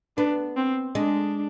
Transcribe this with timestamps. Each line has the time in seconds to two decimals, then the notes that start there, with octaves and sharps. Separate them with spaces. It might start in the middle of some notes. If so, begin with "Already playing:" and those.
0.17 B3 D4
0.57 C4
0.95 G#3 D4